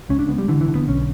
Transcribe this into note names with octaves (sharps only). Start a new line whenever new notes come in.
C#2 C#4
D4
C#2 B3
G3
D3 E3
E3
D3
B3
B1 C#4